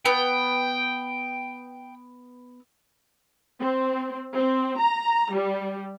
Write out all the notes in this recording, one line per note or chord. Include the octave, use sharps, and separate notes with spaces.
B3 G5
C4
C4
A#5
G3